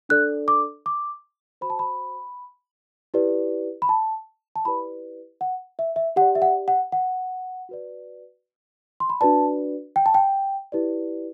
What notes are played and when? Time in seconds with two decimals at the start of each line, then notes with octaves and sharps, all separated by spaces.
0.09 D4 A4 D5 F#6
0.48 D6
0.86 D6
1.61 F#4 C5 B5
1.70 A5
1.79 B5
3.14 E4 G4 B4 D5
3.82 B5
3.89 A5
4.56 A5
4.65 E4 G4 B4 D5 B5
5.41 F#5
5.79 E5
5.96 E5
6.16 G4 F#5
6.21 D5
6.35 E5
6.42 F#5
6.68 F#5
6.92 F#5
7.69 F#4 B4 D5
9.00 C6
9.10 B5
9.21 D4 F#4 B4 D5 A5
9.96 G5
10.06 A5
10.14 G5
10.72 E4 G4 B4 D5